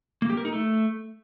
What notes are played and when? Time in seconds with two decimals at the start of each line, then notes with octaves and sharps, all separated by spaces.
0.22 A#3
0.30 G4
0.37 A#4
0.45 D#4
0.52 A3